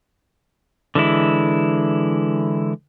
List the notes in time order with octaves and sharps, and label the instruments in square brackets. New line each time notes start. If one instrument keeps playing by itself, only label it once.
[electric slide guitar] D3 E3 G#3 E4